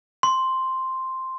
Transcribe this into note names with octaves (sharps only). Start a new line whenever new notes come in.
C6